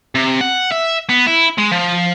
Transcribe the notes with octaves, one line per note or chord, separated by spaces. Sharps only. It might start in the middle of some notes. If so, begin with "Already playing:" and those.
C3
F#5
E5
B3
E4
G#3
F3